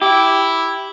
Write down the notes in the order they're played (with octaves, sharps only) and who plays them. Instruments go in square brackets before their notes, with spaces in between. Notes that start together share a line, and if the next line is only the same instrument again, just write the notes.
[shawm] E4 [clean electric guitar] G4